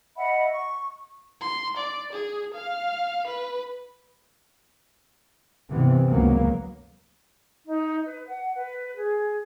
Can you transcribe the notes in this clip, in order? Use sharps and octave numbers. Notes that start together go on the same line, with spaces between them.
D#5 E5 F#5 B5
C#6
C6
D5
G#4
F5
B4
G2 C3 E3 B3
C#2 F#2 F#3 A#3 B3
D#4
B4
F#5
B4
G#4